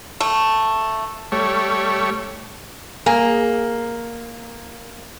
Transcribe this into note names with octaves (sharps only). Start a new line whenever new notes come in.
A3
G3 A3 C#5
A#3 G#4